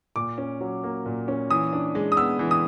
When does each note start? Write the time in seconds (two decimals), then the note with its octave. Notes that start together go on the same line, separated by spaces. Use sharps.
0.16 A#2 D6
0.38 C#4
0.61 F#3
0.84 A#3
1.06 A#2
1.28 C#4
1.50 E3 D#6
1.73 D4
1.95 G#3
2.12 D#6
2.17 B3 E6
2.39 E3
2.51 D#6